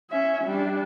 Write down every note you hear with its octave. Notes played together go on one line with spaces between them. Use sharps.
C#4 E5
G3 D4